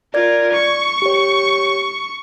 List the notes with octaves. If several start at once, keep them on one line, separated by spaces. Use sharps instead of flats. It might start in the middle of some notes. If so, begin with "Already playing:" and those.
F4 A#4 D5 G#6
C#6
G4 C#5